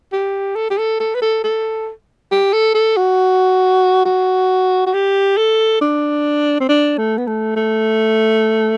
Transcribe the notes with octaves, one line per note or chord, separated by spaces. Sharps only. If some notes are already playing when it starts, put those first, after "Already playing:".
G4
A4
G4
A4
A4
B4
A4
A4
G4
A4
A4
F#4
F#4
F#4
G4
A4
D4
C4
D4
A3
B3
A3
A3